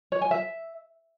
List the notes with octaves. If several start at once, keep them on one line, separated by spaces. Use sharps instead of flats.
C#5
G#5
E5